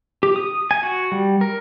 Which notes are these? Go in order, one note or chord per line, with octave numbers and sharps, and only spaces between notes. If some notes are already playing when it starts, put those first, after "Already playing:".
G4
D#6
G#5
F#4
G3
A#4